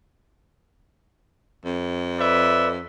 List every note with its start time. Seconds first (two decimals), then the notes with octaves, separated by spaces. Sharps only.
1.65 F2
2.19 B4 D5 E5